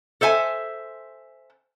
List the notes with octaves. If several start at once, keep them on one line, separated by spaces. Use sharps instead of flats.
A4 C5 E5 G#5